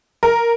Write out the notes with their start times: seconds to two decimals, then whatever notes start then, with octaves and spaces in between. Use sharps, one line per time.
0.23 A#4